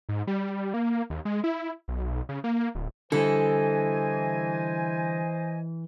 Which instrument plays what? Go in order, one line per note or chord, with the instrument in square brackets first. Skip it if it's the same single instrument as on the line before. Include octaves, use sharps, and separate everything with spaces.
[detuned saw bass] G#2
G3
A#3
D#2
G#3
E4
B1
C#3
A#3
D1
[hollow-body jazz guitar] D3 G3 [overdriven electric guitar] E3 [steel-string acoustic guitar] A4 [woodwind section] C5 D#5 G#5